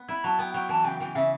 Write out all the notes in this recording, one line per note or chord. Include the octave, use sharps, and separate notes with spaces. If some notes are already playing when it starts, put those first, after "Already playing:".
Already playing: B3
E4 B5
F#3 A5
B3 G5
F#3 G5
E3 A5
C#3 G5
E3 G5
C#3 E5